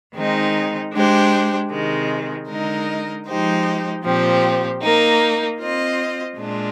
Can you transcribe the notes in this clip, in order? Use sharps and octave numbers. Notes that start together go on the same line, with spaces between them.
D#3 G#3 C4 D#4
G#3 D4 G4 C5
C3 D#3 G#3
D3 G#3 D#4 A#4 D#5
F3 G#3 D#4 G4 C5
A#2 F3 C4 G4
A#3 D#4 A#4
C4 F4 C5 D#5
A#2 G#3 D4 F4